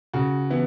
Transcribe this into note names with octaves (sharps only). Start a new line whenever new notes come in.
C#3 F#4
E3 B3 E4